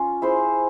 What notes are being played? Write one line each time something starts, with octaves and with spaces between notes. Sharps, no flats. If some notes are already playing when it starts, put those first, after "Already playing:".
Already playing: C#4 F4
E4 G#4 C5